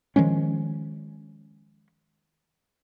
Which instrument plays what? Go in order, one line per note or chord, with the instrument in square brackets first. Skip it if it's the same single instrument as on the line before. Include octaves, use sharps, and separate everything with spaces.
[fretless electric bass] D#3 F3 G#3 C#4